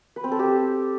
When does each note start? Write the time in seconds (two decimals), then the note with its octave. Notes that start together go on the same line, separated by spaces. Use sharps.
0.16 B4
0.24 C4
0.32 A4
0.39 G4